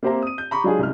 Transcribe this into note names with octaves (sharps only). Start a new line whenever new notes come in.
A#3 C4 G4 C5 E5 A#5
D#6 D#7
G6
A#5 B5 C#6 D6
F#3 G#3 D4 F4 G4 G#4
C2 C#3 G#3 F6